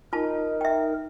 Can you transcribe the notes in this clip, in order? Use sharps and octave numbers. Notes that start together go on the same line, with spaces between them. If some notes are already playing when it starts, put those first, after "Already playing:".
D#4 F4 A#4 A5
E5 G5